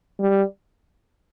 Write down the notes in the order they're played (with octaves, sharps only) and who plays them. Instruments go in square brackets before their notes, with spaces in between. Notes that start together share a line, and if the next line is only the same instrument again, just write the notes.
[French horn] G3